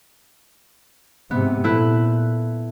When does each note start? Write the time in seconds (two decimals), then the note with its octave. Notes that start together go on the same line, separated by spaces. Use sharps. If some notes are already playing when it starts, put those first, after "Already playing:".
1.31 G#2 C3 B3
1.64 A#2 A3 E4 B4